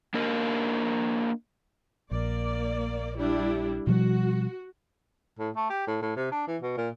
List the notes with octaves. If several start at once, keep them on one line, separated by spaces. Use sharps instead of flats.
A#3 D4 A#4 D#5
A#1 A#3 D5
G3 D4 E4
B2 F3 G3 F#4
A2
A3
G4
A2
A2
C3
D4
E3
B2
A#2